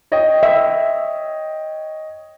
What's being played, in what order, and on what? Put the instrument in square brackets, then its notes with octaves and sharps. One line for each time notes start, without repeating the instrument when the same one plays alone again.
[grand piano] C#5 D#5 G5
[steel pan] E5